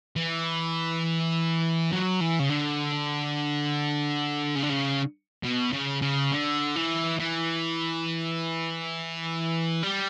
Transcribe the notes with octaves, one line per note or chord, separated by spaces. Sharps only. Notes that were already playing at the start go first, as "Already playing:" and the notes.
E3
F#3
E3
C#3
D3
C#3
D3
C#3
B2
C#3
C#3
D3
E3
E3
G3